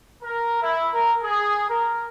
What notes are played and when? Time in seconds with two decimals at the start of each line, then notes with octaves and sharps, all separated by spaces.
0.23 A#4
0.62 E4
0.93 A#4
1.23 G#4
1.69 A#4